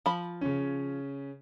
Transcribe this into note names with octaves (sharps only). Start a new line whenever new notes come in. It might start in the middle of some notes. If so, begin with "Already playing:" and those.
F3 B5
C#3 C#4